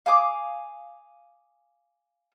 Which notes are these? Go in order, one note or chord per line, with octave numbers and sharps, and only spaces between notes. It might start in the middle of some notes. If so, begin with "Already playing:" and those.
F5 G#5 D6 D#6